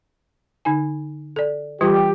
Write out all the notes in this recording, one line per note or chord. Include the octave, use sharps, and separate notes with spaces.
D3 D#4 G#5
A4 D5
E3 G3 F4 G4